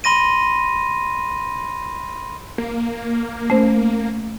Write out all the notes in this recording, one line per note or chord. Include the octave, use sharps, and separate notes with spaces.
B5 C6 A#6 D#7
A#3
A3 C#4 C5